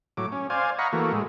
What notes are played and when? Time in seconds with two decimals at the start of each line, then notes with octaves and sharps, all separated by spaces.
0.17 A2 F#3 D6
0.32 C#4
0.50 C5 D5 F5 G#5
0.79 D#5 F5 F#5 A#5 B5 C#6
0.93 E3 A3 A#3 F#4
1.13 A2 G#3